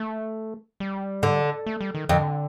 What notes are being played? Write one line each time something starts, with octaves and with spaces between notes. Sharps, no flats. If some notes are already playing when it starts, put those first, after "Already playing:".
Already playing: A3
G3
D3
A3
G3
D#3
F2 D3